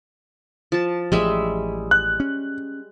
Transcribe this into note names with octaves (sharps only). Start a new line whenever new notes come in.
F3 A5
A1 F3 G3 G#3 E5
F#6
C#4